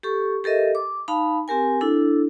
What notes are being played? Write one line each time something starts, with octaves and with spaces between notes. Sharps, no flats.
G4 A4 C#6
G4 A4 A#4 D#5 E5
D6
D#4 F5 A5 B5
C4 G4 A#4 G#5
D4 E4 A4